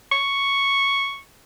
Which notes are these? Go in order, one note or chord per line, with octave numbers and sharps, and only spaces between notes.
C#6